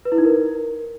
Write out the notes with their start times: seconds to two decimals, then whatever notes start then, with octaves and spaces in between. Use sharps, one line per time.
0.05 B4
0.12 E4
0.18 D#4
0.25 A#4